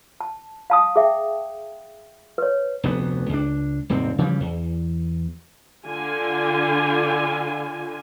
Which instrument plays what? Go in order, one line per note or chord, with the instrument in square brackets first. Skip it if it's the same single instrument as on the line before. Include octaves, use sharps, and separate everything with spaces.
[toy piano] A5
F5 A5 D#6
G#4 E5 G5
B4 C#5
[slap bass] F1 D2 B3
C#2 D4
D#1 G#2 C3 C4
C#3 E3 F3 G3
E2
[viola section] D3 F4 G#5